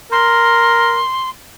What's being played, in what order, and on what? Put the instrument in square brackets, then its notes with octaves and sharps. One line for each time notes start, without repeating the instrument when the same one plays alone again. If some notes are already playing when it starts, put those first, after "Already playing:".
[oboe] A#4 [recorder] C6